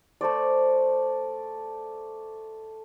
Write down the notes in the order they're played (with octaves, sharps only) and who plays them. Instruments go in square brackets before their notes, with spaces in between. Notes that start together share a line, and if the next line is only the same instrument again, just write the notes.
[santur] A3 A4 C5 D5